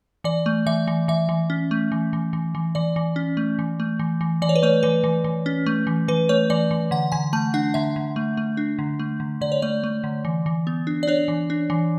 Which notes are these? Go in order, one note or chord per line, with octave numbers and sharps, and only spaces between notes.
E3 D5
A3
E3 E5
E3
E3 E5
E3
C#4
A3
E3
E3
E3
E3
E3 D5
E3
C#4
A3
E3
A3
E3
E3
E3 D5
C#5
B4
A3 C#5
E3 B4
E3
E3
C#4
A3
E3
E3 B4
A3 C#5
E3 D5
E3
D3 F#5
D3 G#5
A3 A5
D4 F#5
D3 E5
D3
A3
A3
D4
D3
A3
D3
D3 D5
C#5
A3 D5
A3
D3
E3
E3
B3
D4
D5
D4 C#5
E3
D4
E3